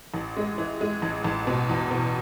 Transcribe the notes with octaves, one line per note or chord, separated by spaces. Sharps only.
A1
G#3
E3
G#3
A1
A1
B2
E2
B2